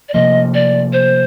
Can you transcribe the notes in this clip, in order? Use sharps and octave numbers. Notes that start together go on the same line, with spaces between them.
D5
C3 F3 A#3 D#5
D5
C5